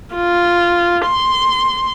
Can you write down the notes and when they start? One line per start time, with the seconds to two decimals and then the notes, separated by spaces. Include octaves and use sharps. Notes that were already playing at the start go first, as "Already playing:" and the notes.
0.15 F4
1.05 C6